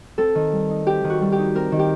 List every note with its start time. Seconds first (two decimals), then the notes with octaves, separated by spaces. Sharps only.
0.18 C4 A4
0.35 D#3
0.52 G3
0.70 D#4
0.86 C4 G4
1.04 D#3
1.10 F#4
1.21 G3
1.32 G4
1.38 D#4
1.55 C4 A#4
1.72 D#3
1.79 G4